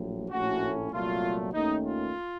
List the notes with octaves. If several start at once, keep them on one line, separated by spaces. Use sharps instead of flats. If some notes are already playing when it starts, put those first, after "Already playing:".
Already playing: A#1 A2 F#3
A#1 A2 A3 C#4 F#4
C2 A#2 F#3 A3 F4
D#2 D#3 A3 C#4 D#4
F4